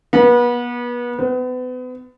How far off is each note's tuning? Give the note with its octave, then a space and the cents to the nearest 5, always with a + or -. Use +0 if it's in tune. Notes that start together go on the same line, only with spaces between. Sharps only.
B3 -30
B3 +35